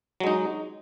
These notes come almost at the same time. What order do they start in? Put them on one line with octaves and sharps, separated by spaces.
F#3 G#3 D#4